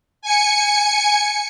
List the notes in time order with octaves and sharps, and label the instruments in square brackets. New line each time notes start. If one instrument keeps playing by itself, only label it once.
[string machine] G#5 C#7